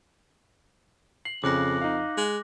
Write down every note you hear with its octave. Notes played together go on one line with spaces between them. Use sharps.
C7 F#7
F2 C#3 D6 F#6 A#6
D#4 F5
G#3